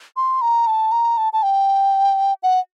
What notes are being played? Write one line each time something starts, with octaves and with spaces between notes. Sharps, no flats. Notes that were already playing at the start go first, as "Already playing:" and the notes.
C6
A#5
A5
A#5
A5
A5
G5
F#5